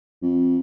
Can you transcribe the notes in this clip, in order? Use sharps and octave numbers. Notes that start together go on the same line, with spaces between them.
F2